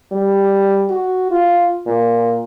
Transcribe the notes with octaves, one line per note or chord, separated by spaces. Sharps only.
G3
F#4
F4
A#2